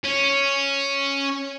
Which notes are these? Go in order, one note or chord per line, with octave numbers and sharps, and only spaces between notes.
C#4